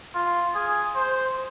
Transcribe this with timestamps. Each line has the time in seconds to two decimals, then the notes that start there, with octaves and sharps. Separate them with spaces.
0.15 F4
0.55 G#4
0.95 C5